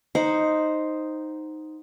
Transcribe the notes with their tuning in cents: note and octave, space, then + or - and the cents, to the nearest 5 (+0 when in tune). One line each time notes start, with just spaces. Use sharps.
D#4 +0 C5 +0 F#5 +0